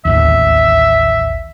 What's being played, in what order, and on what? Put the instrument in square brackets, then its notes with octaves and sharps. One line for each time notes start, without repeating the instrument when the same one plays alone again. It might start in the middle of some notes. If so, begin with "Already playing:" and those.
[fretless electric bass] D1 A1 D#2 [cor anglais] E5